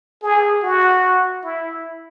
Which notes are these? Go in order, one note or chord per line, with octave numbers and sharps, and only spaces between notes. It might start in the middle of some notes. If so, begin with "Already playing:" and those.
G#4
F#4
E4